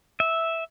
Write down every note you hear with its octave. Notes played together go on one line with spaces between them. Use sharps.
E5